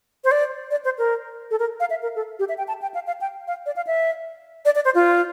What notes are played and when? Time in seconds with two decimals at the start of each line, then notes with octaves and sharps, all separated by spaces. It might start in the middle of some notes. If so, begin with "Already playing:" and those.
0.24 C5
0.31 D5
0.71 D5
0.85 C5
0.98 A#4
1.51 A4
1.59 A#4
1.80 F5
1.90 E5
2.03 A#4
2.16 A4
2.39 G4
2.49 E5
2.58 G5
2.68 A5
2.82 G5
2.94 F5
3.07 F5
3.21 G5
3.48 F5
3.66 D5
3.76 F5
3.87 E5
4.65 D5
4.75 D5
4.85 C5
4.95 F4